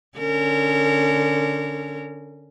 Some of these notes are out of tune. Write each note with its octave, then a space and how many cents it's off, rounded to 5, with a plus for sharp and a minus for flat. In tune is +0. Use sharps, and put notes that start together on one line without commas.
D3 +0 C#4 +0 A#4 -30